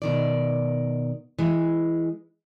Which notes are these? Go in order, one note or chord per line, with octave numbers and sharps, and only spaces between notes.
B2 D#3 D5
E3 G#3